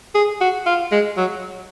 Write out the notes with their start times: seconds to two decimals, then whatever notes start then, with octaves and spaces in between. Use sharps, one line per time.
0.15 G#4
0.41 F#4
0.66 F4
0.92 G#3
1.17 F#3